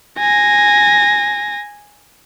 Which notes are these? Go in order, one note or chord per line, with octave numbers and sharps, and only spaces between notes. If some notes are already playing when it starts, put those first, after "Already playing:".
G#5 A#6